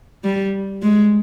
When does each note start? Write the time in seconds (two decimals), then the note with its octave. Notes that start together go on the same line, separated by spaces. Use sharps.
0.24 G3
0.82 G#3